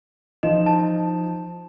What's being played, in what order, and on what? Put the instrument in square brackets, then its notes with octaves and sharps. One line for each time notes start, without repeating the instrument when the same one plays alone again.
[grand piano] F3 D#4 E7 [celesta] D#5
[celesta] A5